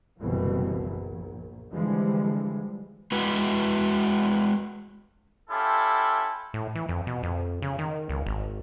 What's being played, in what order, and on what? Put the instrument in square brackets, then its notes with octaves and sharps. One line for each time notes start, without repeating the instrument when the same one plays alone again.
[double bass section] F#1 C2 B2 E3 F3
A#1
D3 E3 F3 G3 G#3
[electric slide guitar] G#3 F#4 B4
[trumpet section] C#4 E4 F4 G4 A4
[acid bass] A2
E3
F2
B2
F2
C#3
D#3
C#2
G#1